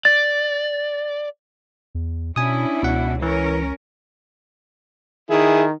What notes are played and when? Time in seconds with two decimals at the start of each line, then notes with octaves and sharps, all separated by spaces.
0.05 D5 A6
1.95 E2
2.36 B2 C#4 D4 E4 G#5 D#6
2.83 C#2 B2 F#5
3.22 E3 C#4 A#4 C#5
5.30 D#3 E4 G#4